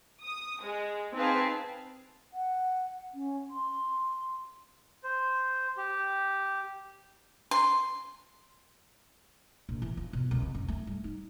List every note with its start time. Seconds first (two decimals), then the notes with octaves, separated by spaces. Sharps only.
0.23 D#6
0.62 G#3
1.15 C4 D#4 G#4 B4 F5 A5
2.33 F#5
3.14 C#4
3.50 C6
5.04 C5
5.77 G4
7.51 C6
9.69 A#1
9.82 E3
9.97 F3
10.13 B2
10.31 C#2
10.42 C4
10.55 F#2
10.68 A3
10.87 G3
11.04 D#4